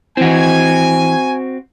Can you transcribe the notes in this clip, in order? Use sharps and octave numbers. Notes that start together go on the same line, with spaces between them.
E3 C4 E4 F#4 G#5